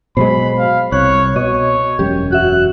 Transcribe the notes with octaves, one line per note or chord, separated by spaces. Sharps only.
B2 F#3 G#3 C5 B5
F5
C2 C#5 F#6
B2 C#5 D#5
E1 F#2 G4
F#4 E5 F#6